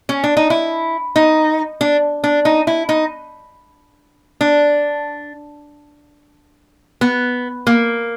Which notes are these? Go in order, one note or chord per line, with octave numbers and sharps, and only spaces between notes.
C#4
D4
D#4
E4
D#4
D4
D4
D#4
E4
D#4
D4
B3
A#3